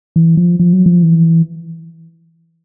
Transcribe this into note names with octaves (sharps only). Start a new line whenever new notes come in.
E3
F3
F3
F#3
F3
E3